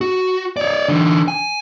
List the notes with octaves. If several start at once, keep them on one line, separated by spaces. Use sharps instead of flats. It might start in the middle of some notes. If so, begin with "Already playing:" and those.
F#4
C#5 D5
D3 E3
G#5